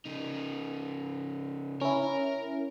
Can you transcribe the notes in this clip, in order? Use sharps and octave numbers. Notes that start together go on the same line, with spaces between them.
C#3 D#4
C#4 E4 A#4